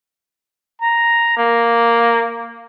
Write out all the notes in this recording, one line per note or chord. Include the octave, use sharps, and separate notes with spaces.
A#5
A#3